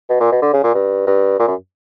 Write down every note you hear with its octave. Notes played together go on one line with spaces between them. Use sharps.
B2
A#2
B2
D3
C#3
A#2
G2
G2
A#2
F#2